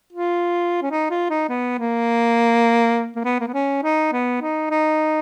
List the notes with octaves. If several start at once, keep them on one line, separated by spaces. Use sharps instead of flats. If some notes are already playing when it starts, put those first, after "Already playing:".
F4
C#4
D#4
F4
D#4
B3
A#3
A#3
B3
A#3
B3
C#4
D#4
B3
D#4
D#4